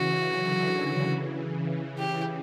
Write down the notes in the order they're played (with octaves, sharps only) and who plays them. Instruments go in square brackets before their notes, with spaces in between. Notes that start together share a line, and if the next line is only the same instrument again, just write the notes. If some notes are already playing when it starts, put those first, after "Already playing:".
Already playing: [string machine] C#3 E3 [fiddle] F#4
[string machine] D3 F#3
C#3 E3
[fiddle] G4